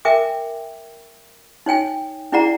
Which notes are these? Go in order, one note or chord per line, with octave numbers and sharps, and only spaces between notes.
A#4 E5 G5 G#5 D6
D#4 C#5 G5 G#5
D4 E4 G#4 D5 F#5 A#5